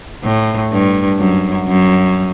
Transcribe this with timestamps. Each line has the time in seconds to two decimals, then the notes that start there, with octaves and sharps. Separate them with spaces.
0.24 A2
0.72 G2
1.19 F#2
1.68 F#2